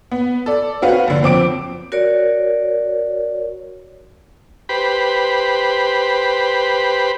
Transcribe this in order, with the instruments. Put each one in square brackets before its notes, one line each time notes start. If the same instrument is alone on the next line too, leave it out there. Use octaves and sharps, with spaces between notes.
[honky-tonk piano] B3
A4 D5
C4 C#4 F#4 B4 F5
A#1 D3
F2 C4 D6 D7
[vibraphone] F#4 A#4 C#5 D5
[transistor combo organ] G4 B4 C5 B5